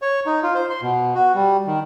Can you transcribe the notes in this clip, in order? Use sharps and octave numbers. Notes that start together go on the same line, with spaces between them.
C#5
D#4
F4
C5
C6
B2
F#4
G3
D#3